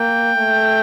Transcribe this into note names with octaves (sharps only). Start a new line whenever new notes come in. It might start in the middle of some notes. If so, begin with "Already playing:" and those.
Already playing: A#3 G5
A3